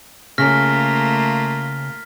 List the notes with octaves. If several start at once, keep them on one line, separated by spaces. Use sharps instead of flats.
C#3 A3 A#3 F4 F6 A#6 B6